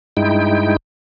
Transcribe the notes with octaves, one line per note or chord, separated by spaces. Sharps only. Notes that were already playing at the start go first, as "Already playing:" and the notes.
G2 G#3 D#4 E4 G5